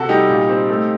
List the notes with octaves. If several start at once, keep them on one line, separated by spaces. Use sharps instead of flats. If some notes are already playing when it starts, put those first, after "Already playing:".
Already playing: C3 F#4 A4
G3 D#4 G4
A#2
C4
A3